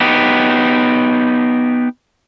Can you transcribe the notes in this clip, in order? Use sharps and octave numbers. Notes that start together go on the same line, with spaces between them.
B3 D#4 G4